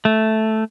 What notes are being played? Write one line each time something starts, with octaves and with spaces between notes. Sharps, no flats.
A3